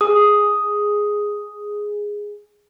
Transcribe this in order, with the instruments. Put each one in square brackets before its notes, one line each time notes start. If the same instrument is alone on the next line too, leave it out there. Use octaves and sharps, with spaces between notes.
[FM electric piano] G#4 [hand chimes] D#6